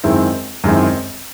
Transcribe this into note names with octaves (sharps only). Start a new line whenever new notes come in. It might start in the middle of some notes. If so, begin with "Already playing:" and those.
F#2 D#3 G#3 C4 E4
F#2 D#3 G#3 C4 E4